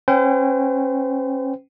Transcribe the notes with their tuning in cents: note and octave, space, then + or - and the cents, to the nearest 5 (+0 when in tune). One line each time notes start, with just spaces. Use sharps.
C#4 -30 C5 -45 G5 -20